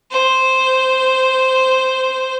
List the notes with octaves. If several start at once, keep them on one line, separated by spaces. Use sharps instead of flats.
C5